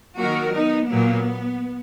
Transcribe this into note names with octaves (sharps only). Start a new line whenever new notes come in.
D#3 F#3 A#3 F#4 A#4
B3 D#4
A#2 F#3 A#3 B3